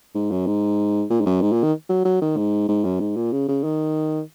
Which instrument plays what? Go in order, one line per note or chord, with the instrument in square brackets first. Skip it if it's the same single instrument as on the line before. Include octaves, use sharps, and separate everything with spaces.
[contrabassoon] G#2
F#2
G#2
A#2
G#2
F#2
G#2
A#2
D#3
F#3
F#3
D#3
G#2
G#2
F#2
G#2
A#2
C#3
C#3
D#3